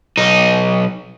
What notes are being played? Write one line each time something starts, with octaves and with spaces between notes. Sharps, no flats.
B1 D#4